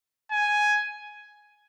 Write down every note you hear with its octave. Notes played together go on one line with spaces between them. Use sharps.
G#5